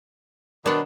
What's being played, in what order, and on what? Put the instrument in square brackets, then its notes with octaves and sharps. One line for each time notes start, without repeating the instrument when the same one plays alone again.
[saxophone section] B2 D#3 [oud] B3 D4